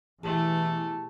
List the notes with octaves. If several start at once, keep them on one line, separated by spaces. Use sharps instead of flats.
B2 E3 A3 E4 G4 G#4 A5